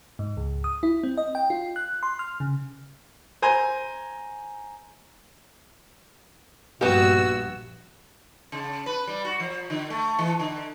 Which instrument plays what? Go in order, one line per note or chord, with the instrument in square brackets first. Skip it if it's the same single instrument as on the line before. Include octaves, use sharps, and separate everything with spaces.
[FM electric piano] G#2
C#2
D#6
E4
C4
D#5
G5
F4
F#6
C6
F6
C#3
[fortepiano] C5 G#5 A#5
[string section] A#1 G2 E6 [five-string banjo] B3 G4 [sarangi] F#4
[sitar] C#3
B4
G3
F#4
F3
D3
A3
E3
D3